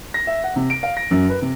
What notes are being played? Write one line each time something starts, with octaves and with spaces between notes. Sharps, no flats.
A#6
E5
F#5
C3
D7
F5
A#6
F#2
B4
C3